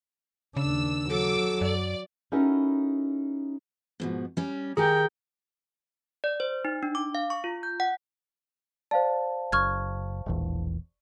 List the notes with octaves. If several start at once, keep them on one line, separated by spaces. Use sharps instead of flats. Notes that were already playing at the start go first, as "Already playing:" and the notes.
D#2 C#3 D4 E6
F#3 A4 D6 E6
F#2 D5
C#4 D#4 E4 F#4 A4 A#4
G#2 B2 F3
G3 C#4
D#3 G4 G#4 A#4 G5 G#5
D5
C5
D#4
D4
D6
F5
C#6
F4
G6
F#5
C5 D5 F5 A5
F#1 C#6 F6 G#6
E1 A#1 E2